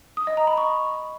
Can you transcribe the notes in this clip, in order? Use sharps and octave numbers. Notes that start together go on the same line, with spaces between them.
D#6
D#5
A#5
B5
C#6